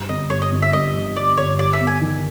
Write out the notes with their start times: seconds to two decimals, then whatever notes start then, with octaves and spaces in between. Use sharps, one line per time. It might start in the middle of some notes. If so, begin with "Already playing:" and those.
Already playing: G2
0.09 G1 D#5
0.30 G2 C#5
0.42 D#5
0.52 G1
0.62 E5
0.73 G2 D#5
0.95 D3
1.16 G3 D5
1.37 G1 C#5
1.58 G3 D5
1.73 E5
1.80 B3
1.87 G#5
2.01 D#3